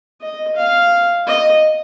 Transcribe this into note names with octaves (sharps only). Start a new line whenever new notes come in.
D#5
F5
D#5